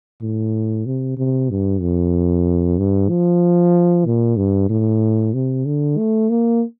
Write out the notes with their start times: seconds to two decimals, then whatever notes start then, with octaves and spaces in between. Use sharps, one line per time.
0.22 A2
0.86 C3
1.17 C3
1.50 G2
1.81 F2
2.78 G2
3.09 F3
4.05 A#2
4.37 G2
4.69 A2
5.34 C3
5.65 D3
5.98 A3
6.29 A#3